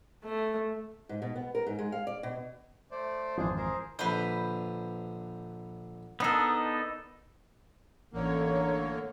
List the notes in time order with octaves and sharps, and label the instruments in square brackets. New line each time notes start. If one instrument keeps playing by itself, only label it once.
[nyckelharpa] A3
[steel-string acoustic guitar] G#2
B2
B3
A#4
G#2
G#3
F5
D5
B2
[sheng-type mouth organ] A3 C5 D5
[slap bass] G#1 F2 E3 [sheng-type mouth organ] D4 G#4 C5
[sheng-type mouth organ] G#4 A#4 C5
[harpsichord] A#1 D3 [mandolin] B4 C5
[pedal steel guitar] B3 D#4 A4 [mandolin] D4 A#4
[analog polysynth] A1 C#5 [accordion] D3 A#3